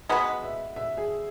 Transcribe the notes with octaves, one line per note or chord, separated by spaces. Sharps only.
G#3 B3 F#4 B4 F#5
E5
E5
G#4